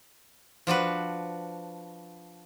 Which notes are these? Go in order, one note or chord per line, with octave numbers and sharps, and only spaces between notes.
F3 D4 F#4 B4